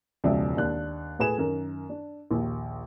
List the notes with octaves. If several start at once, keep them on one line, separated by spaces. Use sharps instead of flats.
E1 C#2 F3 D5 E5
D#2 D4 F#6
A2 G#4 B4 G#5 E7
F#2 D#3 A#4
D4
A#1 D#2